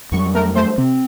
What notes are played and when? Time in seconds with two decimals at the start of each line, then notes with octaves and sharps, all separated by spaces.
0.12 F2 F#3 G3 C#6
0.35 A3 A#4
0.55 A3 C5
0.78 C3 C4